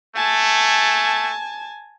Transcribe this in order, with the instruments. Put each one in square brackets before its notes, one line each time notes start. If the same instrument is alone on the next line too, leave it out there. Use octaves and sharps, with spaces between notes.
[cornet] A3 [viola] G#5 A5